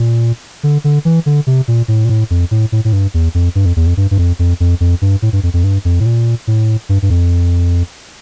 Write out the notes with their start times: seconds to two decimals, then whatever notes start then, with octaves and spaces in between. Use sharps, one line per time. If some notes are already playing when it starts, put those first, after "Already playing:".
Already playing: A#2
0.63 D3
0.84 D3
1.05 E3
1.26 D3
1.47 C3
1.68 A#2
1.88 A2
2.05 A#2
2.09 A2
2.30 F2
2.51 A2
2.72 A2
2.85 A2
2.93 G2
3.14 E2
3.35 F2
3.55 G2
3.66 F2
3.76 E2
3.87 F2
3.97 G2
4.11 G2
4.18 F2
4.39 F2
4.60 F2
4.80 F2
5.02 G2
5.22 A2
5.33 G2
5.43 F2
5.54 F2
5.64 G2
5.85 F2
6.00 A2
6.06 A#2
6.47 A2
6.89 G2
7.02 G2
7.10 F2